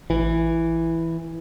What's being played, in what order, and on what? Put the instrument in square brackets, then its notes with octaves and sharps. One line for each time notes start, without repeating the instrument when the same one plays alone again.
[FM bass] A1 [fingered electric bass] E3